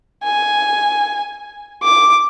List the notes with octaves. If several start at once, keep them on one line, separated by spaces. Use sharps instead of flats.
G#5
D6